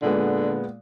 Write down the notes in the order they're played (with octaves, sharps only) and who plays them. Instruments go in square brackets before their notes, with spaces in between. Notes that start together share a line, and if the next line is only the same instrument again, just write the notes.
[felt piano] A#2 G#3 B3 [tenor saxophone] D3